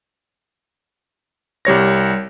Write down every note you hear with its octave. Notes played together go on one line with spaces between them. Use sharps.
C2 G3 C#5 A#6